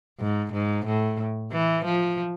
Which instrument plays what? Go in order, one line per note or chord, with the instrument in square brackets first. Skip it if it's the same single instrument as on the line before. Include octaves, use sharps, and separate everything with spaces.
[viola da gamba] G#2
G#2
A2
E3
F3